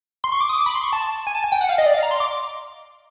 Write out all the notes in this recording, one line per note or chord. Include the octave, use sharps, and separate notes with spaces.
C6
C#6
D6
D#6
D6
B5
C6
C#6
A5
G#5
A5
G#5
G5
F#5
F5
D#5
D5
F5
A#5
C6
D6